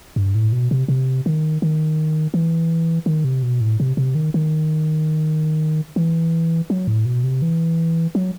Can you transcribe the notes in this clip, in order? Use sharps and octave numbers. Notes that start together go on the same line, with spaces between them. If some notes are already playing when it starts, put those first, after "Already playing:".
G2
A2
B2
C3
C3
D#3
D#3
E3
D#3
C3
B2
A2
C3
C3
D#3
D#3
E3
F#3
A2
B2
C3
E3
F#3